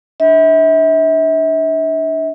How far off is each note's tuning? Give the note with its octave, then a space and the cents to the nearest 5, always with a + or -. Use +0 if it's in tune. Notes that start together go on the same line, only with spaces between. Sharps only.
D4 +0 E5 -35